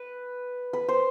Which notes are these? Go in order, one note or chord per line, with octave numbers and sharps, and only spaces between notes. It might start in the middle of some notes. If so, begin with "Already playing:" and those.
Already playing: B4
B4
C5